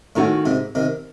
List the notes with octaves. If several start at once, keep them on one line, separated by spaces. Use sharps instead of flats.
A2 D#3 A3 C#4 F#4
G#2 C3
C3 D#3